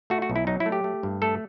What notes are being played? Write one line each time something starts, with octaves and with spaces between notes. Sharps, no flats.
A3 F#4
F#4
B1
E4
F#3 D#4
E4
A3
G4
A3
G2
A3 A4